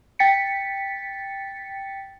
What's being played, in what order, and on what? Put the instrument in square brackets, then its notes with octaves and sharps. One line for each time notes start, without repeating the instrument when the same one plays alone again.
[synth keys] G5 A6 B6 C#7